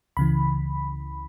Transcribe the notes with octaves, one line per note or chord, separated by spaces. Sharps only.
C#2 C#3 E3 B5